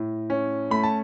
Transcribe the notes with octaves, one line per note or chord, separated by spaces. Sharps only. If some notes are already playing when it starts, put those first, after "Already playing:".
Already playing: A2
C#4
A3 B5
A5